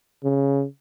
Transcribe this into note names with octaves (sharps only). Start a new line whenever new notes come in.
C#3